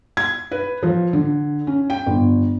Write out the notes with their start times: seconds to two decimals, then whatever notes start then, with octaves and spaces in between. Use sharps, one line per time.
0.17 G#6
0.51 B4
0.83 F3
1.13 D3
1.67 C#4
1.90 G5
2.06 G1